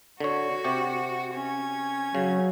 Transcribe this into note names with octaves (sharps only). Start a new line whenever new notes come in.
D3 F#4 C#5
C3 G4
C#4 G#6
C#3 F#3